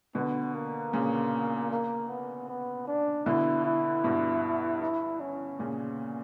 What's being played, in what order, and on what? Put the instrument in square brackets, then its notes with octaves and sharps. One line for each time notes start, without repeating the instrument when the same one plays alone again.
[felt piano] B2 D3 [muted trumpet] B3
[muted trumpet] A#3
[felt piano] A#2 C#3
[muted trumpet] A#3
B3
B3
D4
[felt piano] B2 D3 [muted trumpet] E4
[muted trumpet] E4
[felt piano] G2 B2
[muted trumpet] E4
C#4
[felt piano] A#2 C#3